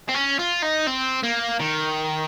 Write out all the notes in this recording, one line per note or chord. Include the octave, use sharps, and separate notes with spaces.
C4
C#4
F4
D#4
C4
A#3
D#3